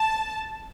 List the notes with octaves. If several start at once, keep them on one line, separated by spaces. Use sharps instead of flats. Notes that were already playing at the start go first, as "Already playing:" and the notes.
Already playing: A5